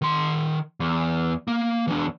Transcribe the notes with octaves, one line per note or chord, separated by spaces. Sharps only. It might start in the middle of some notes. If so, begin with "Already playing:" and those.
D#3 C6
E2
A#3
E2 D4